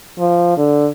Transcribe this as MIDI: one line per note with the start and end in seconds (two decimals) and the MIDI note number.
0.18 0.52 53
0.57 0.88 50